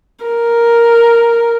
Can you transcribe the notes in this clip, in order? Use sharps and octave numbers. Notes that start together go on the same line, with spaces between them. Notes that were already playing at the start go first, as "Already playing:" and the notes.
A#4